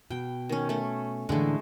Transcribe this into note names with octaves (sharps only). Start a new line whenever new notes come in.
B2 G5
D#3 C#4
A3 C#4
A2 D3 E3 G#3 A3